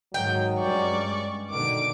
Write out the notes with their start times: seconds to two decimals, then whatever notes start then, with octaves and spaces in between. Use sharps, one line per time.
0.14 G#2 D#3 F#3 G5
0.60 G2 G#3 C#4 D5 C#6
1.50 B2 D3 D#3 D6 D7